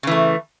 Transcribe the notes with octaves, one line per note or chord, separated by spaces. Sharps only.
C#3 E3 A3